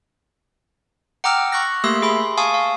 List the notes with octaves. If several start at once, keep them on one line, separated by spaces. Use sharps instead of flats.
F#5 G5 A#5 D6 E6 F6
C#6 F#6 A#6
A3 A#3 G4 E5 C6 E6
G#4 B5 C6
F5 G#5 A5 C#6 D#6
F5